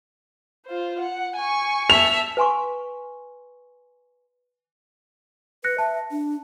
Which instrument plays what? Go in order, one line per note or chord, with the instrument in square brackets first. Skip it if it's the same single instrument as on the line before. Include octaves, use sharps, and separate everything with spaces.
[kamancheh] F4 C5
F#5
G#5 C#6
[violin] E5 A5 [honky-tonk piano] F7
[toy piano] B4 G#5 C6 C#6
[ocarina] B4 [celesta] F#6 A#6 C#7
[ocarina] E5 [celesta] A5
[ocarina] D4